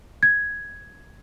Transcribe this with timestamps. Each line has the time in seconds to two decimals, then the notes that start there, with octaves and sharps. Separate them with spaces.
0.23 G#6